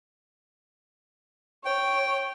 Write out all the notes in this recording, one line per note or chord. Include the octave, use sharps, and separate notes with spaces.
C#5 G5